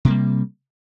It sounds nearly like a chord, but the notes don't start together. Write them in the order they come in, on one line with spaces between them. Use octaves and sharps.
C3 A#3 G3